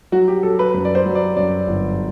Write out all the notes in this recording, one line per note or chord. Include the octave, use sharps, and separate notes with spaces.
F#3 F#4
G4
F#3 A4
B4
F#2 B4
D5
C5
F#3
D5
F#2 D5
G1